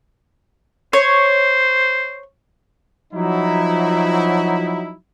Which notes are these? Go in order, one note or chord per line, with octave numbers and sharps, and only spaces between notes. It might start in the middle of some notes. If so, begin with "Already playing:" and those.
C5 C#5
F3 F#3 D#4 E4